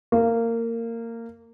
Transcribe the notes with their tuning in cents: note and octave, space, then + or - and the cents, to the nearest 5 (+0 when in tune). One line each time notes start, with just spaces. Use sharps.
A#3 -20